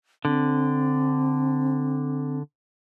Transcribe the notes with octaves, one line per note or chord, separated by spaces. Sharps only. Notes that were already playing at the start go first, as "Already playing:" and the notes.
D3 C4